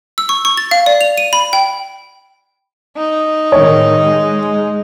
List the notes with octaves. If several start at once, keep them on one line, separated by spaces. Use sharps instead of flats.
E6
C#6
C#6
A6
F5
D5
F7
D#7
B5
G5
D#4
A2 D#3 G#3 C#5
G#3